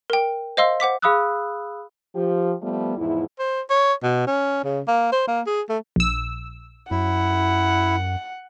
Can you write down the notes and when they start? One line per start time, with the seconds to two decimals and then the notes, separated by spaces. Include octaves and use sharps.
0.10 A#4 G5
0.57 C5 D#5 F5 C6 E6
0.80 C5 F#5 D6 B6
1.02 G#4 F5 B5 D#6 E6 F#6
2.16 F3 G4
2.62 F3 G3 A3 B3
2.97 E2 G#2 F3 E4
3.39 C5
3.70 C#5
4.03 B2
4.27 C#4
4.64 C#3
4.88 A#3
5.12 C5
5.28 A#3
5.46 G#4
5.69 A3
5.96 A#1 E6
6.91 F#2 E4 F#5